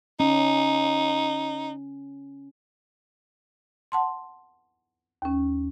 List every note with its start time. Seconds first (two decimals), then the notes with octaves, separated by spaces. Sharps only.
0.20 C#4 D#4
3.92 F#5 A5 C6
5.22 D#2 C#4